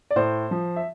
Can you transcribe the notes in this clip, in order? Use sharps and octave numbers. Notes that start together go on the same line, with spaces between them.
D5
A2 C5
F3
E5